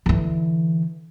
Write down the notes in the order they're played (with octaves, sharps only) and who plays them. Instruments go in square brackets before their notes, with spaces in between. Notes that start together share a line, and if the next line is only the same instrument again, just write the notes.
[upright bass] D3 E3